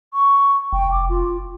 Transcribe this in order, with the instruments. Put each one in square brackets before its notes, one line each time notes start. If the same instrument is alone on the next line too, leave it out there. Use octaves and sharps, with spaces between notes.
[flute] C#6
[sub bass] F1 [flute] G5
[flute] D6
F4